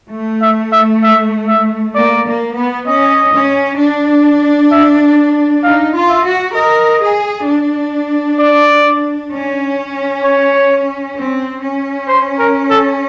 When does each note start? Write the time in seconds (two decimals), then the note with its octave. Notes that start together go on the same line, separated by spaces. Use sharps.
0.11 A3
0.42 E5
0.72 E5
1.03 E5
1.48 E5
1.95 A#3 D5
2.26 A#3
2.56 B3
2.87 C#4 D#5
3.33 C#4
3.79 D4
4.71 E5
5.63 D#4 F5
5.94 F4
6.09 E5
6.25 F#4
6.56 A#4 D#5
7.02 G#4
7.47 D4
8.39 D5
9.32 C#4
10.24 C#5
11.16 C4
11.63 C#4
12.08 C5
12.38 A#4
12.70 A4